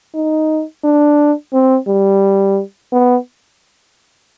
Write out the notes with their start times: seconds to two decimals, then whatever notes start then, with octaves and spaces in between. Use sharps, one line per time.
0.14 D#4
0.84 D4
1.53 C4
1.88 G3
2.92 B3